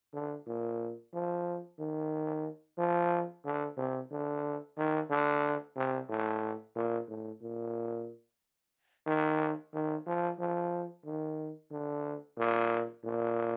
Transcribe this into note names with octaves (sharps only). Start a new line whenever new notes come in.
D3
A#2
F3
D#3
F3
D3
C3
D3
D#3
D3
C3
A2
A#2
A2
A#2
D#3
D#3
F3
F3
D#3
D3
A#2
A#2